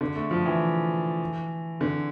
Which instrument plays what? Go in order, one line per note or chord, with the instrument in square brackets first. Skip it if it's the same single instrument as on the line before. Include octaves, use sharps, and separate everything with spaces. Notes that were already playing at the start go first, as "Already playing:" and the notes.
[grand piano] D3
A3
F3
E3
D3